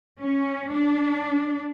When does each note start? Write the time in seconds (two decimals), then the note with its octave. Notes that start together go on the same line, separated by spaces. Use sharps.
0.21 C#4
0.72 D4